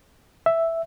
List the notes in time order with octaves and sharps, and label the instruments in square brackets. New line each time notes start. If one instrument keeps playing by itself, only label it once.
[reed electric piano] E5